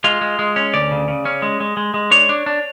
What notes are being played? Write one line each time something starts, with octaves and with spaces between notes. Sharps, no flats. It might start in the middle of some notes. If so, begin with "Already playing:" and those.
G#3 F4
G#3
G#3
C#4
D2 D5
C#3
C#3
C#4
G#3
G#3
G#3
G#3
D4 C#5
D4
D4